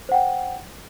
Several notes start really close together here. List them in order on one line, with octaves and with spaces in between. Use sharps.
C5 F#5 G5